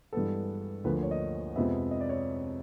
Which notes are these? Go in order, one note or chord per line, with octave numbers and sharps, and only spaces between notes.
G2 E3 G#3 B3 A4
D2 D3 F3 A#3 B4
C#5
D#5
F2 C3 F3 G#3 B3 E5
D#5
D5
C#5